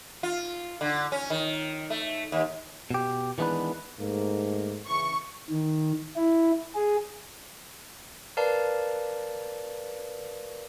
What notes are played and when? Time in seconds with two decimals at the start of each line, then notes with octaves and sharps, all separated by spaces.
0.23 F4
0.81 D3
1.12 C#4
1.30 D#3
1.90 A3
2.32 D#2
2.90 B2 G4
3.38 D#3 E3 G#3 B3 D4 B4
3.99 G#2 A3 A#3
4.87 C#3 E3 C#6
5.50 D#3
6.16 E4
6.75 G#4
8.37 A#4 B4 D5 F5 A5